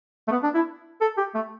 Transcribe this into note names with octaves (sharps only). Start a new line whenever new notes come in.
A3
B3
D4
E4
A4
G4
A3